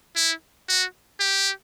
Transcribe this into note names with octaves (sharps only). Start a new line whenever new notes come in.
E4
F#4
G4